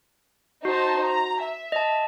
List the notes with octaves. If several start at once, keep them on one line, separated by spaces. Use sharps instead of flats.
D#4 F#4 C5 A5
A#5
E5
D#5 A5